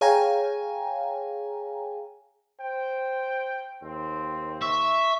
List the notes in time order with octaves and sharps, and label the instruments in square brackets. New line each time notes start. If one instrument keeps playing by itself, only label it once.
[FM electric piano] G#4 C#5 F5 G5 G#5 A#5
[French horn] C5 [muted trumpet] G5
[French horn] D#2 [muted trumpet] C4
[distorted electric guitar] E5 [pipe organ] C#6